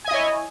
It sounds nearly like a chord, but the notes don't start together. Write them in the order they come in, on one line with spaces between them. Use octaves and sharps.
G#5 D#5 E4 C#5